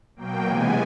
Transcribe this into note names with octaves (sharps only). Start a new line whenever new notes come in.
B2 F#3 A#3 G5
C3 E3 G#3 B3 G#5